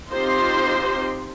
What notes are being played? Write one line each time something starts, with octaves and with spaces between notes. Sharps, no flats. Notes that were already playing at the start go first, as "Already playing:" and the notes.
C4 D#4 F4 G4 C5 C6